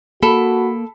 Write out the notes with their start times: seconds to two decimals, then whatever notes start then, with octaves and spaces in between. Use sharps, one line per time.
0.22 A#3 F#4 A4 B5